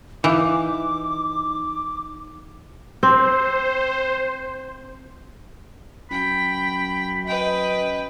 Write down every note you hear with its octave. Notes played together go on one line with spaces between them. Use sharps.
E3 D#4 F5 D6
C4 C5
F#2 G5 B5
B4 D#5 G5